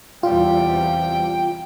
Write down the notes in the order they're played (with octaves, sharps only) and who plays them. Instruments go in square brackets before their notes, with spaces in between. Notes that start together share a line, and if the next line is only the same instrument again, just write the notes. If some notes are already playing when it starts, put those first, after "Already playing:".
[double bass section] E2 C3 G3 [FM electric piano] F4 [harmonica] G5